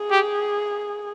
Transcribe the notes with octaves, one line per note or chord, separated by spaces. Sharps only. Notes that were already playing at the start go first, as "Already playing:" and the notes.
Already playing: G#4
G4